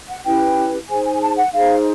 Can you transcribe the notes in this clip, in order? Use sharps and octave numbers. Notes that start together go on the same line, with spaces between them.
F#5
C#4 E4 G4 B4 G5
D#4 G#4 C5 G#5
G#5
A5
F#5
D#4 G#4 C5 F5